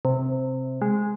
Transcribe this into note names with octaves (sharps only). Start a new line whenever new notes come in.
C3
G#3